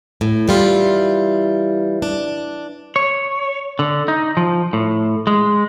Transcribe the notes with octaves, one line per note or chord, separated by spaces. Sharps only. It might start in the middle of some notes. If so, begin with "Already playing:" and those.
A2
E3 G3 F4
D4
C#5
D3
D#4
F3
A2
G#3